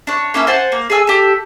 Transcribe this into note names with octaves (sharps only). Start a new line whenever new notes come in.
D4 C#5
A#3 C#4 E4 A4
C5 F#5 G#5 A5
A#3
G#4 A4 G#5 E6
G4 A4